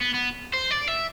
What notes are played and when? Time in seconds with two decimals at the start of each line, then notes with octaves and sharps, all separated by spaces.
0.02 B3
0.14 B3
0.54 C5
0.71 D5
0.88 E5